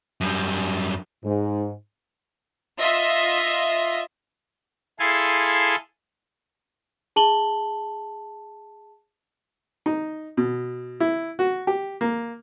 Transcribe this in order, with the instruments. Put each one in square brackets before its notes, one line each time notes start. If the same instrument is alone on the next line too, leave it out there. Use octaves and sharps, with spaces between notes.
[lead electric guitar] F#2 G3
[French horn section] G#2
[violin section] F4 D#5 E5
[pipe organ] E4 G#4 A4 F5 G#5 C6
[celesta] G#4 A5 F#7 G7
[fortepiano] D#4
B2
E4
F#4
G4
A#3